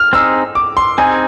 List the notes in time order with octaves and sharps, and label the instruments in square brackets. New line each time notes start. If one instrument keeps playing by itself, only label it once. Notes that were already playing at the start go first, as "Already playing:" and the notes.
Already playing: [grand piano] F6
[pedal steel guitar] C4 D#4 G#4 [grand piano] E6
[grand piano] D6
C6
[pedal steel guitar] C4 D#4 G#4 [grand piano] G#5